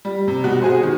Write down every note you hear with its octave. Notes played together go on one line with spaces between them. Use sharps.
G3
C3
B2 F#4
F#4 G#4 C5
D#3